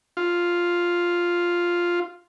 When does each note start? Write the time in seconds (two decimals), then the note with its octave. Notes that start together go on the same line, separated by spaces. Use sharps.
0.17 F4